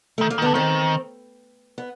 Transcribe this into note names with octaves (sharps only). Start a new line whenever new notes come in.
D#3 A3
A#3
D#3
D3 B3
D#3 C4
B3